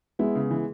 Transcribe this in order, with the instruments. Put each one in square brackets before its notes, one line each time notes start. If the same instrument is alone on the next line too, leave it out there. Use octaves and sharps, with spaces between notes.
[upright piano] G#3 B3 [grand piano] E4
[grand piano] C#3
E3